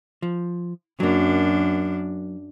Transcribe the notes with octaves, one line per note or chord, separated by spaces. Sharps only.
F3
F#2 F#3 A#3 D4